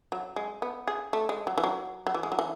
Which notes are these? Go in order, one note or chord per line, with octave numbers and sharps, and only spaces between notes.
F#3
G#3
B3
G#4
A3
G#3
F#3
E3
F#3
F#3
E3
G#3
F#3
E3